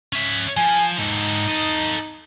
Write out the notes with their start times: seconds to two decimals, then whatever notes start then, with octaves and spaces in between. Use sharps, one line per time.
0.13 C#4 E5
0.57 F3 G#5
0.99 G#2 D#4 A4
1.48 A4 D#5